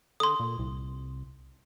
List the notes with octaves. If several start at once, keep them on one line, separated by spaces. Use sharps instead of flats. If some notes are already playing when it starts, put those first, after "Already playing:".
D3 C6 D#6
A#2
C2